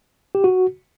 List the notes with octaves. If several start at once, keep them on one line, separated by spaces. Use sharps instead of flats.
G4
F#4